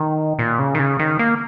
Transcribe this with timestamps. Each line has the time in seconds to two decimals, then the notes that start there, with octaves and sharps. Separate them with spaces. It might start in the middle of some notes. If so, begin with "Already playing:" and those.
Already playing: D#3
0.39 A#2
0.59 C#3
0.75 D#3
0.79 C#3
0.99 D#3
1.19 A#3